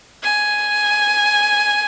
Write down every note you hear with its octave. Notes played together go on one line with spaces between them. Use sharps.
G#5